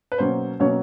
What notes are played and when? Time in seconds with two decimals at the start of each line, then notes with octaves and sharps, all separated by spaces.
0.12 B4
0.18 B2 F#3 A#3 C#4 C5
0.60 B2 F#3 A#3 C#4 C#5